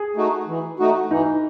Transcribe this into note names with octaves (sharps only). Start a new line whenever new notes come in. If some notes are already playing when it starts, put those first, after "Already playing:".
Already playing: G#4
A3 D#4 F#4
E3
A3 D#4 F#4
E3 D#4